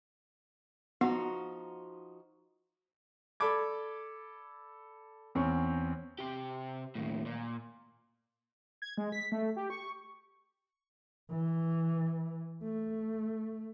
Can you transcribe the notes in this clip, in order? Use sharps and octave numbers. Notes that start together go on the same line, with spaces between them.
F3 B3 D#4 F#4
A4 D5 B5 D6 G#6
E2 C4 C#4 C#6
C3 G4
D#2 A2
A#2
G#6
G#3
B6
A3
G4
C#6
E3
A3